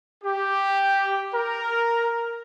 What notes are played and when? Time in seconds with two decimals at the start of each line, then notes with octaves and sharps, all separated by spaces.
0.24 G4
1.33 A#4